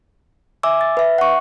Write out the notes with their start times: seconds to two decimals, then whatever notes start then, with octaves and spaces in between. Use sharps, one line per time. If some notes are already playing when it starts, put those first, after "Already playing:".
0.63 E5 G#5 D6 E6
0.81 A6
0.97 B4 E5
1.18 F#5 C#6